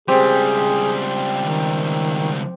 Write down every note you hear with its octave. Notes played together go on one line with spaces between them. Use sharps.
C#2 G3 C4 G4 G#4
D#3